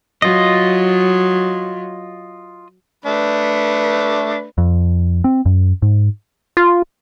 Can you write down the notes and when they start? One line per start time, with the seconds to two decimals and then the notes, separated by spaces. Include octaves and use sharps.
0.22 F#3 F4 D#5
3.06 A3 D4 B4
4.58 F2
5.24 C4
5.46 F#2
5.82 G#2
6.57 F4